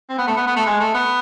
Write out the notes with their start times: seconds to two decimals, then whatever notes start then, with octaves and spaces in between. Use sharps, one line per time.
0.09 C4
0.18 B3
0.27 A3
0.37 B3
0.47 B3
0.56 A3
0.66 G#3
0.80 A3
0.94 B3